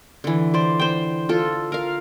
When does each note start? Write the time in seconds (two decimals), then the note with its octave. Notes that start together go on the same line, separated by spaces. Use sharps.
0.24 D3 E3
0.54 C5 D5
0.79 C5 G5
1.29 F4 A4
1.72 A#4 F5